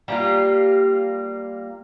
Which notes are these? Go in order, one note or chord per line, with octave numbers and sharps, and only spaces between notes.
G3 A#3 F4